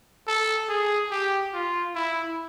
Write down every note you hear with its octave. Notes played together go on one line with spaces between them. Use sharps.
A4
G#4
G4
F4
E4